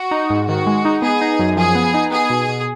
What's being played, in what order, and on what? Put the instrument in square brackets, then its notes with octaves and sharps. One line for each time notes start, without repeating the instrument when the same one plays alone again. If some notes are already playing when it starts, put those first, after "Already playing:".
Already playing: [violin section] F#4
[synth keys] D#4
G#2
[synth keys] D#3 [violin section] F#4
[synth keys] G#3
D#4
[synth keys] B3 [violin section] G#4
[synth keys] D#4
F#2
[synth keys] F3 [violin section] G#4
[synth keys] B3
D#4
[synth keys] B3 [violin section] G#4
[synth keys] B2
B2